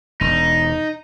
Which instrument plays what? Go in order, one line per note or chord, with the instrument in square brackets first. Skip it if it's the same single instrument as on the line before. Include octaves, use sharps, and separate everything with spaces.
[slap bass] E1 [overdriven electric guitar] D#4